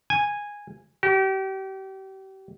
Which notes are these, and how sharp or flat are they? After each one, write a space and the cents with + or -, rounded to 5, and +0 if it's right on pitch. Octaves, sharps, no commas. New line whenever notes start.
G#5 -10
G4 -35